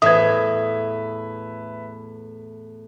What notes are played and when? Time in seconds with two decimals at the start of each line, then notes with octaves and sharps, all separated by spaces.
0.02 E2 A2 B4 E5 D#6 G#6